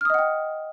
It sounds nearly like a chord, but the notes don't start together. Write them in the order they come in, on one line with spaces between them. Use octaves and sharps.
F6 D#6 D#5 F#5 G5